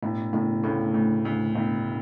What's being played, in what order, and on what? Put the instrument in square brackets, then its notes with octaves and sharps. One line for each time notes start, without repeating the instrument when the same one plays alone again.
[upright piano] E1 [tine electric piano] A2
[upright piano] E1 [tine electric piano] A2 C#3
[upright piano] D2 [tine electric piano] A2 C#3
[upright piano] D2
D2
E1